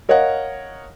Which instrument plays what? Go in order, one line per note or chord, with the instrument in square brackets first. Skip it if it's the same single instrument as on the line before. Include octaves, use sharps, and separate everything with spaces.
[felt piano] A#4 C#5 D#5 F5 F#5